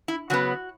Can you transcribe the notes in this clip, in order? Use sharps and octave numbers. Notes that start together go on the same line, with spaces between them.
E4
C#3 F#3 B3 F#4